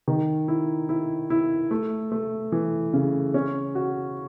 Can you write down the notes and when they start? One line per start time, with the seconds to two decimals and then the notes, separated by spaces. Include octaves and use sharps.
0.08 D#3
0.48 E4
0.89 E4
1.30 E4
1.71 A3
2.12 A3
2.52 E3
2.93 C#3
3.34 C#4
3.75 F#4